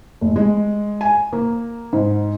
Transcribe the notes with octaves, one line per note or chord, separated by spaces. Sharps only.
F1
G#3
G#5
A#3
G#2